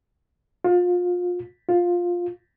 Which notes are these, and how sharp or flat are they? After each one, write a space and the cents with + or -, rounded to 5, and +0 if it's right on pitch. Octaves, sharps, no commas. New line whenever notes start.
F4 +30
F4 +10